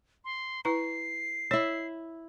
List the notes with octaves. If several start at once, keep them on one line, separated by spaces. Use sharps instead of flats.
C6
E4 B4 A#5 C7
E4 C#5 E5